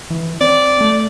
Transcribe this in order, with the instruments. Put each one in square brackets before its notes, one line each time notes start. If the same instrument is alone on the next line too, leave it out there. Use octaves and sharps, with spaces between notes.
[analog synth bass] E3
[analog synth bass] C4 [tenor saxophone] D5
[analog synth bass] A3